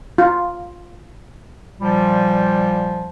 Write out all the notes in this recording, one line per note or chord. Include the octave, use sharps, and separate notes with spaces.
F4
A#2 F3 G3